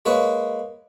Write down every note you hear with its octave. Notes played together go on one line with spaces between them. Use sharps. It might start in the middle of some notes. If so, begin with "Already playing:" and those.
G#3 A#3 B4 C#5